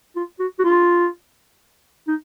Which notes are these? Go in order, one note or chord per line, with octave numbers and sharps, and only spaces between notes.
F4
F#4
F#4
F4
D#4